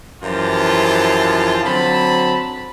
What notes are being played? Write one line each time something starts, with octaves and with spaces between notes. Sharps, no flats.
F#2 E3 F3 F4 G4 A5
D3 F#3 C4 A5 B5